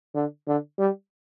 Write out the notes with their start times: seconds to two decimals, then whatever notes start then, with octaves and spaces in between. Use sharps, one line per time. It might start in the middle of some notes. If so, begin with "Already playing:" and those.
0.14 D3
0.47 D3
0.79 G3